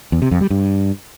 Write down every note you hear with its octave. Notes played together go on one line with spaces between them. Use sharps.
E2
C3
F2
G3
G2